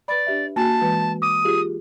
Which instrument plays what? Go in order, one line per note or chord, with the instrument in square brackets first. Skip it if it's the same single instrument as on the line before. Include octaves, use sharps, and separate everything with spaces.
[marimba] B4 B5 [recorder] D5
[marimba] D4 G4 E5
[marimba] A#3 F#4 G#5 [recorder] A5
[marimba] E3 G#3 B4
[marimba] D6 [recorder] D#6
[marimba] F4 G4 G#4